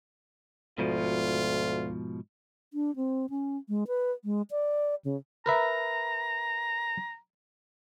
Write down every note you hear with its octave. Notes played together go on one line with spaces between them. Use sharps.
D2 G#2 B2 F3 F4
D4
C4
C#4
G#3
B4
G#3
D5
C#3
A#4 B4 E5 A#5